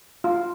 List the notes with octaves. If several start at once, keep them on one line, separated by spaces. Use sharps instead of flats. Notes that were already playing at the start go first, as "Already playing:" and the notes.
F4